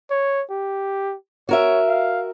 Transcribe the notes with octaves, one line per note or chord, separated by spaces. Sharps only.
C#5
G4
F#4 A#4 C#5 E5
F5